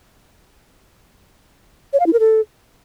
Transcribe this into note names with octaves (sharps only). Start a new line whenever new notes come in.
C#5
F5
E4
A#4
A4